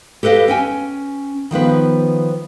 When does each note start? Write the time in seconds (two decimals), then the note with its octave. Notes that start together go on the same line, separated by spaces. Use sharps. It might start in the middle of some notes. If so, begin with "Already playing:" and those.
0.23 G4 A4 B4 D#5 F5
0.48 C#4 G5 G#5
1.51 D#3 F3 B3 B4